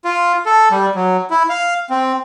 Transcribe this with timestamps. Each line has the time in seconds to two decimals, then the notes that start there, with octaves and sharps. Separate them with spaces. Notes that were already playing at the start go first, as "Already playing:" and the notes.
0.05 F4
0.46 A4
0.71 G3
0.95 F#3
1.30 E4
1.50 F5
1.90 C4